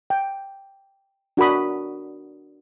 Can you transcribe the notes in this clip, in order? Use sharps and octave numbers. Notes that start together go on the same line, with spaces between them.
G5
D4 F#4 A#4 B5 D#6